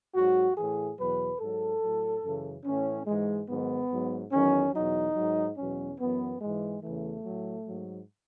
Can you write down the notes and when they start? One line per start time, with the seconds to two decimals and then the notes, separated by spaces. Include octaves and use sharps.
0.14 G#2 F#3 F#4
0.56 A2 E3 G#4
0.97 E2 B2 F#3 B4
1.39 G#2 F#3 A4
1.82 A2 F#3
2.23 F#2 C#3 E3
2.65 A2 E3 C#4
3.06 G#2 E3 G#3
3.48 G#2 D#3 F#3 B3
3.90 G#2 F#3
4.32 E2 D#3 F#3 C#4
4.74 E2 B2 F#3 D#4
5.16 G#2 F#3
5.58 E2 B2 F#3 C#4
6.00 F#2 E3 B3
6.41 G#2 E3 G#3
6.83 E2 C#3 E3 A3
7.25 A2 F#3
7.66 G#2 F#3